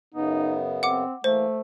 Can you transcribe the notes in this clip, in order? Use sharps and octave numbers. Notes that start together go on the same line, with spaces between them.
F#2 C#3 B3 D#4
C4 F#5 D6
E3 A3 A#3 C5